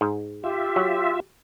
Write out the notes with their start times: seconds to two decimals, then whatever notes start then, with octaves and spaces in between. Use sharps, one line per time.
0.01 G#2
0.44 F4 G4 E5
0.76 F#3